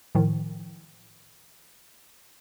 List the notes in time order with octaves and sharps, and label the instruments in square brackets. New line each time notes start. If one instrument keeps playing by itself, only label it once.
[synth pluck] A2 D#3 F3